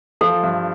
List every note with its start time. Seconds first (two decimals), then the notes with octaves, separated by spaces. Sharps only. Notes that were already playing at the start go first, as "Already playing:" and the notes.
0.21 F3 A4
0.43 G2